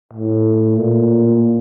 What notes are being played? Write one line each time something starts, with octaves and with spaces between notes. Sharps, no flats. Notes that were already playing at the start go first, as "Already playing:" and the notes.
A2
A#2